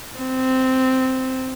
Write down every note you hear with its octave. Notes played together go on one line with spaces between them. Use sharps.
C4